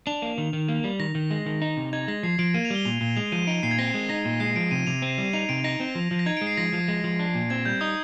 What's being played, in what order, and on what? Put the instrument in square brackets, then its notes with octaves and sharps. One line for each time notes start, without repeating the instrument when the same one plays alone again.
[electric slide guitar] D4 [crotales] F7
[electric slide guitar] A#3
D#3
D#3
A#3
G3
[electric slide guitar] D#3 [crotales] A#6
[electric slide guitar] D#3
G#3
D#3
D#4
C3
[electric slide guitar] D#4 [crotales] G#6
[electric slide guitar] G#3 [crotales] A#6
[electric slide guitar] F3 [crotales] C7
[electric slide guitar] F3 [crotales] D7
[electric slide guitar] A#3 [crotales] D#7
[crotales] F7
[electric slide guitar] G3 [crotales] G7
[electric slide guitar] A#2 [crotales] F7
[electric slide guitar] A#2
[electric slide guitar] G#3 [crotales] F7
[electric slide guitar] F3 [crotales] D#7
[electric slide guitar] D#4 [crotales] D7
[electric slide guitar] A#2 [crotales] C7
[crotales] G#6
[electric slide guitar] C4 [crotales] A#6
[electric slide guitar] G#3
[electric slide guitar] D#4 [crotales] A#6
[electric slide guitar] A#2
[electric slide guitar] G#3 [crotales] C7
[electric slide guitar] F3 [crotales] D7
[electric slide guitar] C3 [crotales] D#7
[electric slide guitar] C3 [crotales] F7
[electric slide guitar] C4 [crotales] D#7
[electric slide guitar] G3
[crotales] D#7
[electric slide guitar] D#4 [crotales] F7
[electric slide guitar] C3 [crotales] D7
[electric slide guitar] D#4 [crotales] A#6
[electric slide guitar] C4
F3
F3
[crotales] A#6
[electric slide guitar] D#4 [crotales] G#6
[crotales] D7
[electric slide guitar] G#3
[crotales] C7
[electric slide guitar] F3 [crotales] A#6
[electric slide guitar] F3
G#3
F3
D4
A#2
[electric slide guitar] C4 [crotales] G#6
[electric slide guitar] G3 [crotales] G6
[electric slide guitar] D#4 [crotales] D#6